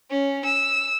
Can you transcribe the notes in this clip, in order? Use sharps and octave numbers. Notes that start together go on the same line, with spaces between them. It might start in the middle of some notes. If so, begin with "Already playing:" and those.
C#4
E6